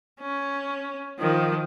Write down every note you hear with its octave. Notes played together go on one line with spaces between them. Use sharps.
C#4
D#3 F3